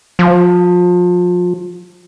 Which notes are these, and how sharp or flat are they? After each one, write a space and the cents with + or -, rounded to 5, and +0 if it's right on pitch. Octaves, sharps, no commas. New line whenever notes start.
F3 +30